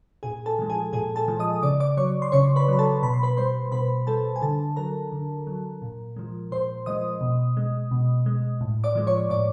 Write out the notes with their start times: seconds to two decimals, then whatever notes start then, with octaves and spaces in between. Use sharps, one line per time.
0.23 A#2 G#4 G#5
0.46 A4 A5
0.59 F3 G#3
0.70 G#4 G#5
0.93 A#2 G#4 G#5
1.16 A4 A5
1.28 F3 G#3
1.39 D#5 D#6
1.62 C#3 D5 D6
1.80 D5 D6
1.97 F#3 C#5 C#6
2.22 C6
2.32 C#3 C#5 C#6
2.56 B4 B5
2.68 F#3 A#5
2.79 A4 A5
3.02 B2 B5
3.14 C6
3.23 B4 B5
3.37 G3 C5 C6
3.72 B2 B4 B5
4.07 G3 A4 A5
4.36 G#5
4.42 D3 A4 A5
4.76 F#3 A#4 A#5
5.12 D3
5.47 F#3
5.82 A#2
6.16 F3 G#3
6.51 A#2 C5 C6
6.86 F3 G#3 D#5 D#6
7.21 B2
7.57 G#3
7.91 B2
8.26 G#3
8.61 A2
8.84 D5 D6
8.95 F3 G#3
9.07 C#5 C#6
9.30 A2 D5 D6